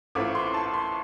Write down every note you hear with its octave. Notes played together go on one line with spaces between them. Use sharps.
A1 A2 A3 C4 F4 D6
C6
A5
C6